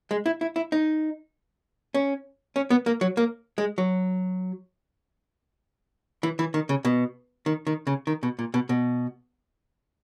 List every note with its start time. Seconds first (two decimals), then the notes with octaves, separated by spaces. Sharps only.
0.11 G#3
0.26 E4
0.41 E4
0.56 E4
0.72 D#4
1.94 C#4
2.56 C#4
2.70 B3
2.86 A#3
3.01 F#3
3.17 A#3
3.58 G#3
3.78 F#3
6.23 E3
6.39 E3
6.54 D#3
6.69 C#3
6.85 B2
7.46 D#3
7.67 D#3
7.87 C#3
8.07 D#3
8.23 B2
8.39 A#2
8.54 B2
8.69 B2